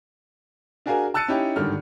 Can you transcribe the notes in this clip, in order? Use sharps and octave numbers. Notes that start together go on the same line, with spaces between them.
D4 F#4 G#4 A#4 F5 G#5
A5 E6 F#6 A6 C#7 D#7
C#4 D#4 E4 G4 G5
G#1 G2 D3 D#3 F6